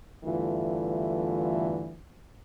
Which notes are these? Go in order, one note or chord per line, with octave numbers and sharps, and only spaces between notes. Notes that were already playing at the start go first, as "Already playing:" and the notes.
E2 G2 D3 E3 A3 F4